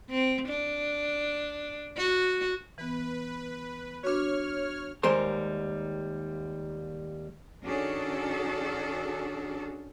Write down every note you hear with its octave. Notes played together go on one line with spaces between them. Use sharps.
C4
D4
F#4
E3 B3 B4
D4 F#4 C#5 F6
D#2 G3 G#3 A#4 C5 C6
D#3 C#4 D4 F#4 G#4 A4